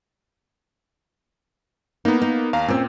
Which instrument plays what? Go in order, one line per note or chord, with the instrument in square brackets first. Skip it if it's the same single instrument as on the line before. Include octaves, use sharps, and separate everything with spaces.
[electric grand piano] A#3 B3 [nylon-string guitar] D#4
[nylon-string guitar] D#4
[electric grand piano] D#2 F5 A#5
[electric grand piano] A#2 [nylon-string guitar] C4 C#4